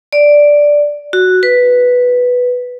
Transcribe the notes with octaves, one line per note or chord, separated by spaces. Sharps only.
D5
F#4
B4